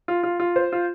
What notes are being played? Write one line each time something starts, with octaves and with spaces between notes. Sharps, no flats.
F4
F4
F4
C5
F4